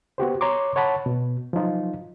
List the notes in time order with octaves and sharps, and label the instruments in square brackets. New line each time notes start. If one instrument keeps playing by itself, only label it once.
[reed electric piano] B3 F#4 G4 C5
C#5 A#5 C6 D6
C#5 F#5 A5 B5
B2
F3 F#3 D#4 F4